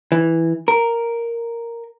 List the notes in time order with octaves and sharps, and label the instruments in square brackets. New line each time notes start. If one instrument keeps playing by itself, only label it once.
[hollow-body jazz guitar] E3
A#4